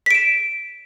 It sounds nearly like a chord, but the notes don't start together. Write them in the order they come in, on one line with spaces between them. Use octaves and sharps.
B6 D7 E7